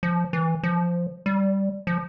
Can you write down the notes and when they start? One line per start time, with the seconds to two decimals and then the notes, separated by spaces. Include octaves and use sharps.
0.03 F3
0.33 E3
0.63 F3
1.26 G3
1.87 F3